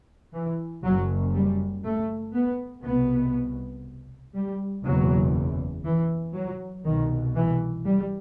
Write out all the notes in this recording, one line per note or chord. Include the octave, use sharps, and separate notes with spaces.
E3
F#1 F#2 F#3
G3
A3
B3
C2 B2 B3
G3
F#1 E2 B2 F#3
E3
F#3
C2 B2 D#3
E3
G3